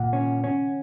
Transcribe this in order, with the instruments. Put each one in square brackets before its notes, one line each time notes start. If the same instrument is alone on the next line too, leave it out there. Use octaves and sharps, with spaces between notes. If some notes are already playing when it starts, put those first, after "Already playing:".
Already playing: [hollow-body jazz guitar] A#2 [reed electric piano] F#5
[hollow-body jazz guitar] C#4
C#4